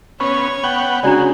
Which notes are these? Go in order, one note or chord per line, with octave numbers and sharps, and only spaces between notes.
B3 C#4 C#5
B3 F#5 G5
C#3 G#3 D4 E4 F#4 D5